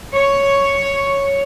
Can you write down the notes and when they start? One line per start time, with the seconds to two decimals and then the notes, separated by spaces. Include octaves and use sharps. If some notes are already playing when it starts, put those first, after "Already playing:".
0.14 C#5